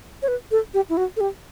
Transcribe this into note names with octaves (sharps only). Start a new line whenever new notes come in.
C#5
B4
A4
G4
E4
F#4
A4
G4